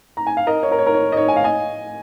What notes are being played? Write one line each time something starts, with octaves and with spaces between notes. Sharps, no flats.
A#5
G#5
F5
A#4 D#5
C#5
A#4
C#5
A#4
C#5
D#5
C#5
G#5
F5
D#5 G#5